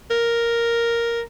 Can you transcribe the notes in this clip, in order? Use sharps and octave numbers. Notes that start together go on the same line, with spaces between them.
A#4